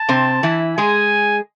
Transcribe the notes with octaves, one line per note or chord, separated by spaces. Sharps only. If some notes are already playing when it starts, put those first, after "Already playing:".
Already playing: A5
C3 C4
E3 E4
G#3 G#4 G#5